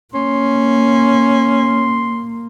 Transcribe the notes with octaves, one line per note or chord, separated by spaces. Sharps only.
A#3 C#4 C6